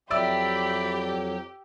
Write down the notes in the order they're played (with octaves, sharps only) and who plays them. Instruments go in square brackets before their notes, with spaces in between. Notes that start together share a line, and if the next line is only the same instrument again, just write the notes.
[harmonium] F2 F#3 [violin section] G4 [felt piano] D5 E5 E6 [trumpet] B5